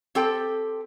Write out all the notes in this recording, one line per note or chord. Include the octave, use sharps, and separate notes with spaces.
C4 G4 A4 G5